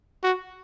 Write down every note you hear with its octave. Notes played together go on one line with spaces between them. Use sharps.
F#4